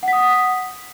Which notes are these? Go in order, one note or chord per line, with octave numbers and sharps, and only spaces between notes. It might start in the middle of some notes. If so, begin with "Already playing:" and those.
F#5 D#6 B6